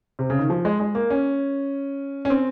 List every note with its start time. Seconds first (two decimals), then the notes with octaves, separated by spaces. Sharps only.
0.19 C3
0.30 C#3
0.39 D#3
0.50 F3
0.65 G#3
0.80 G#3
0.95 A#3
1.10 C#4
2.25 C#4
2.30 C4